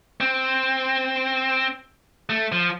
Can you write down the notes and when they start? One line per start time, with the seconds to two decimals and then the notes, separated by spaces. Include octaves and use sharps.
0.21 C4
2.30 A3
2.52 F3